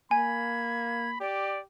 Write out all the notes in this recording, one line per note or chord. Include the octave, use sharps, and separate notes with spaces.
A#3 G#5 B5 G#6
G4 D5